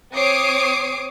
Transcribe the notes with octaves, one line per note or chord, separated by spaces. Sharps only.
C4 C#5 D6 D#6 C7 D7